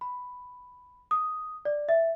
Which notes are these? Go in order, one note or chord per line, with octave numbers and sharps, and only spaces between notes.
B5
D#6
D5
E5